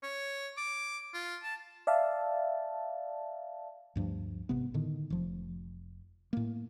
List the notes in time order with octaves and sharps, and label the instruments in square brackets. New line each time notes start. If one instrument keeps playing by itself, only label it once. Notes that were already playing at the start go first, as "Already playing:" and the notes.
[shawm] C#5
D6
F4
A5
[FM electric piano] D5 E5 F5 A5
[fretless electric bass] D2 G2 F3
G#1 C3 B3
A2 D3 D#3
F1 F3
A2 A#3